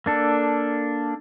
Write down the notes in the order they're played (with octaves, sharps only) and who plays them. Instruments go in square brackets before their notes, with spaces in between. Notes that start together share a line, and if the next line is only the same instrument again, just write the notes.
[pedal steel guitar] A#3 D4 A4